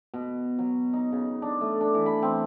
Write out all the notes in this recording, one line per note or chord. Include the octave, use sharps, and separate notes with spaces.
B2
F#3
D#4
C#3
D4
A3
D4
E3
B5
C4